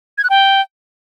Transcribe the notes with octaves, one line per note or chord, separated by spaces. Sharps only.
G#6
F#6
G5